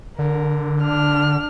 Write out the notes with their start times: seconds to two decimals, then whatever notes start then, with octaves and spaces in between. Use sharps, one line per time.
0.19 D3 A#4
0.81 D4 F6